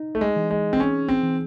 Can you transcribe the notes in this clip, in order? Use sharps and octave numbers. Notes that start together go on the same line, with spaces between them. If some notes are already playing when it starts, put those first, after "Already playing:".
Already playing: D#4
A3
G#3
E3
G#3
C4
C#4 G#4
C4
E3